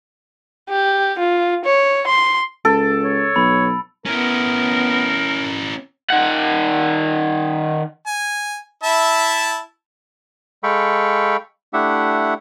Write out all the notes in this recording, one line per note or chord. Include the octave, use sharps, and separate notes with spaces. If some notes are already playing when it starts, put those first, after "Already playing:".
G4
F4
C#5
C6
C#2 A4 D7
C#5
B1 B5
B3 C#4 E4 A#4
D#3 F#5
G#5
E4 E5 A5
G#3 A4 F5 G5 B5 C#6
A3 D4 E4 G4 E5 F#5